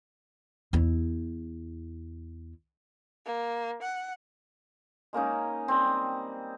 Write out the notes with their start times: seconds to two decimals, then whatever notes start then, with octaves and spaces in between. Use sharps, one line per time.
0.73 E2 E4
3.26 A#3
3.82 F#5
5.13 G#3 A#3 C#4 D#4
5.68 G3 C4